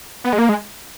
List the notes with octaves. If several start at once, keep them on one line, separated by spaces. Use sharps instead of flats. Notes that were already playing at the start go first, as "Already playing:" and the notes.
B3
G#3
A#3
G#3